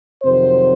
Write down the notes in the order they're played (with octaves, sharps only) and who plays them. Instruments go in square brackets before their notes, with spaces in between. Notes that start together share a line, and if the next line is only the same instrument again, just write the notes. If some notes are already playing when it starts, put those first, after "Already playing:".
[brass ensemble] F2 C3 D#3 F#3 C5